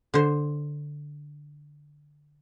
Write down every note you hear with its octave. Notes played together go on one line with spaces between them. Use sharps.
D3 C5